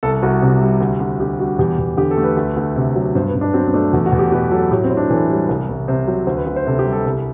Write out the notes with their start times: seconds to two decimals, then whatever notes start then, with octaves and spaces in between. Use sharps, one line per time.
0.03 C2 A4
0.22 C2 F#4
0.42 C3
0.62 G3
0.81 D2
1.00 D2
1.20 D3 G4
1.39 G3 F#4
1.59 E2 G4
1.78 E2
1.97 D3 G4
2.11 A4
2.17 A3
2.24 B4
2.37 D2
2.56 D2
2.76 C3
2.96 F#3
3.15 G2 C5
3.28 B4
3.35 G2
3.41 D4
3.54 F#3 C4
3.67 C4
3.74 A3 D4
3.93 E2 F#4
4.06 F#4
4.12 E2
4.19 G4
4.32 B2 B4
4.51 F#3 A4
4.71 A2 G4
4.84 C4
4.90 A2
4.97 D4
5.10 E3 A4
5.30 G3
5.49 C2
5.69 C2
5.88 C3 C5
6.08 F#3
6.27 D2 C5
6.37 B4
6.46 D2
6.56 C5
6.66 C3 A4
6.79 G4
6.86 G3
6.93 A4
7.05 C2